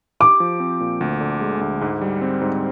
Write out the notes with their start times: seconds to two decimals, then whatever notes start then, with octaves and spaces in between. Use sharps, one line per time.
0.20 G4 D6
0.40 F3
0.60 C4
0.80 A#2
1.01 D2
1.21 D3
1.41 G#3
1.61 D2
1.81 G#2
2.01 G3
2.21 C4
2.41 G#2